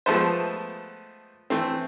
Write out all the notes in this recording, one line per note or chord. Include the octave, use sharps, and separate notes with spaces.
F3 G#3 A3 B3 B4 C5
E3 A3 C4